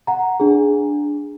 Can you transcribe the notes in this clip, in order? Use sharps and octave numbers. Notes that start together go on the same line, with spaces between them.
F#5 A#5
D4 G#4